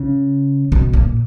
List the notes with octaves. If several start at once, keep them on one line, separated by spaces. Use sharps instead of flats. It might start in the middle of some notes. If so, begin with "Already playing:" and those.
Already playing: C#3
B2
A#2